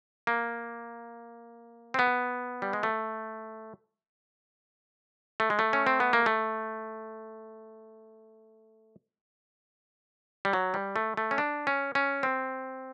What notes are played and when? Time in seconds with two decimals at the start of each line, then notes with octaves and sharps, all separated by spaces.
0.27 A#3
1.94 C4
1.99 B3
2.62 G3
2.73 G#3
2.83 A3
5.40 A3
5.50 G#3
5.59 A3
5.73 C#4
5.87 C4
6.00 B3
6.13 A#3
6.26 A3
10.45 G3
10.53 F#3
10.74 G3
10.96 A3
11.17 A3
11.31 C#4
11.38 D4
11.67 C#4
11.95 C#4
12.23 C4